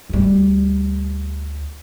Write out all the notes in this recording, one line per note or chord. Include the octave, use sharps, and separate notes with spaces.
D2 G3